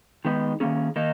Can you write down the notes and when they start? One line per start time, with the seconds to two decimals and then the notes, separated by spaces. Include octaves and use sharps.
0.25 D#3 G#3 B3 D#4
0.60 D#3 A#3 C#4 G#4
0.96 D#3 A#3 D#4